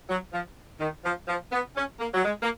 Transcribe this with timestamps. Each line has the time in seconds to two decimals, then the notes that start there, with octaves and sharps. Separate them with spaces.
0.09 F#3
0.33 F3
0.80 D#3
1.05 F3
1.28 F3
1.52 B3
1.76 C#4
2.00 A#3
2.14 F#3
2.25 G#3
2.43 A#3